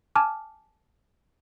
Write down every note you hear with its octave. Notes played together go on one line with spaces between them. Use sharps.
G#5 A5 D6 F6